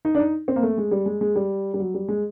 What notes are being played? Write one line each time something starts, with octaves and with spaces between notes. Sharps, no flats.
D#4
D4
D#4
C4
A#3
A3
G#3
G3
G#3
G#3
G3
G3
F#3
G3
G#3